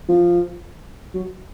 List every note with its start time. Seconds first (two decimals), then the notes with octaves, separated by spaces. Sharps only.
0.08 F3
1.14 F#3